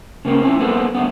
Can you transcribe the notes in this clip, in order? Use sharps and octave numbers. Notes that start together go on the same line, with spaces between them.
C#3 A#3 C4 C#4
C4 C#4 E4
A#3 B3 A4 B4 C5
D3 F#3 A3 B3